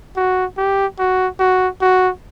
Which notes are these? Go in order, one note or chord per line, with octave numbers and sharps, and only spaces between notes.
F#4
G4
F#4
F#4
F#4